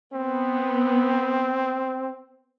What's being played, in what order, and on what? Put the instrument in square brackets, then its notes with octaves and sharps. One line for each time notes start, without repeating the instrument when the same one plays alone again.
[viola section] B3 [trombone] C4